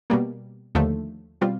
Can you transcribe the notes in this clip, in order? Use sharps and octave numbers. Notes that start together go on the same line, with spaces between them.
B2 G3 A#3
D#2 D3 F3 A3
B2 G3 C4 F4